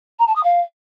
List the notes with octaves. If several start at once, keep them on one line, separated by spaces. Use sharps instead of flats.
A#5
A5
D#6
F5